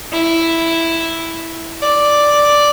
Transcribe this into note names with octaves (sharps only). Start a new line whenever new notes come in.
E4
D5